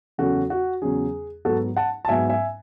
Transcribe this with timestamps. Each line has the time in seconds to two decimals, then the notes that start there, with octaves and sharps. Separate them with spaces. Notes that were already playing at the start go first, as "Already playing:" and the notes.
0.18 E2 C#3 F#3 C#4 F#4 A4
0.50 F#4
0.82 E2 C#3 F#3 C#4 G#4
1.45 G#2 F#3 B3 F#4 A4
1.77 F#5 A5
2.05 A5
2.08 G#2 F#3 B3 E5 G#5
2.29 E5 G#5